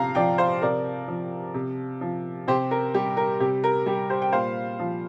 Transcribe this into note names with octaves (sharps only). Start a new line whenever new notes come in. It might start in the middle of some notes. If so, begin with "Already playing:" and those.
Already playing: C3 F3 F5 A#5
F3 D5 G5
C5 F5
C3 A#4 D5
F3
C3
F3
C3 G4 C5
A#4
G3 G4
A#4
C3 G4
A#4
G3 G4
G4 C5
G5
A#2 C5 F5
F3